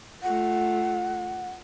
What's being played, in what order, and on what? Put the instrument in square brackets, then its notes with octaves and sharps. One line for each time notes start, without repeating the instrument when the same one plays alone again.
[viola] A3 F4 [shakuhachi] F#5